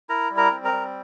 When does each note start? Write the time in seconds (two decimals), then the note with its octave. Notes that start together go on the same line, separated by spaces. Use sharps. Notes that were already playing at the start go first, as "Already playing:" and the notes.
0.09 E4 A#4 A#5
0.30 G3
0.37 A#4 A#5
0.51 C4
0.64 A#4 A#5
0.72 G3